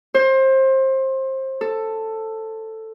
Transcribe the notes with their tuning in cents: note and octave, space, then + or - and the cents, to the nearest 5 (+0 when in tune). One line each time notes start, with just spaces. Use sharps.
C5 +25
A4 +10